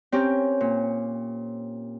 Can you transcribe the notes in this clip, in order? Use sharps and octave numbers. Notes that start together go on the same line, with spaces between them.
C4 C#4 G4 A#4
A#2